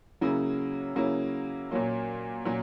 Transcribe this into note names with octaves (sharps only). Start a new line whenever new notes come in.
C#3 F#3 A#3 C#4 E4
C#3 F#3 A#3 C#4 E4
A#2 F#3 A#3 C#4
A#2 F#3 A#3 C#4